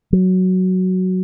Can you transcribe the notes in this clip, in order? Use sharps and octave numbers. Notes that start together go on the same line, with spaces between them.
F#3